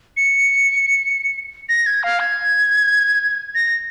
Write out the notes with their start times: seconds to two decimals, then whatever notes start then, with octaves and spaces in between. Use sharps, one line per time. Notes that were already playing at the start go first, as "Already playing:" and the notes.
0.17 C#7
1.69 A#6
1.86 G#6
2.03 F5
2.20 G#6
3.55 A#6